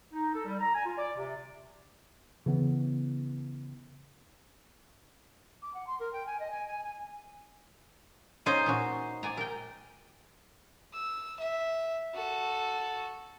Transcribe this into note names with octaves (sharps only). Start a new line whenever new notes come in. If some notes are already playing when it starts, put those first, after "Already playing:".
D#4
A4
G3
A#5
G#5
F4
D5
C3
C#3 E3 B3
D6
F#5
C6
A#4
G5
G#5
D#5
G#5
G#5
G#5
C#4 D#4 F4 G#4 C5
A#2 C#4 F#4
D5 G#5 A#5
A#4 G5
E6
E5
F#4 A4